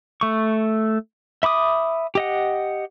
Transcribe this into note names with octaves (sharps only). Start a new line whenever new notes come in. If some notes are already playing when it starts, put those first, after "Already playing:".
A3 C#6
E5 B5 D6 D#6
G4 D#5 F#5